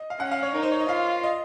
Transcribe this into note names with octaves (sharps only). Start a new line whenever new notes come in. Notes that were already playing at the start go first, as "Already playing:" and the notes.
Already playing: D#5
F5
C#4 F#5
F5
C#5
D#4 A#4
C5
C#5
D#5
F4 F5
D#5